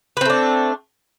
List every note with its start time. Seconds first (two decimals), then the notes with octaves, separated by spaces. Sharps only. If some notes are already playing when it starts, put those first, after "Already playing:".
0.17 B4
0.21 C4
0.25 A3
0.30 D4